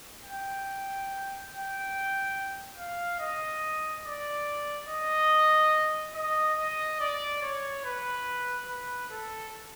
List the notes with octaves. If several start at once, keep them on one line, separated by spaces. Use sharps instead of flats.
G5
G5
F5
D#5
D5
D#5
D#5
D#5
D5
C#5
B4
B4
A4